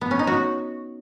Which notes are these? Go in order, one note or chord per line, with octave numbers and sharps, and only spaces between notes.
B3
C#4
D#4
F#4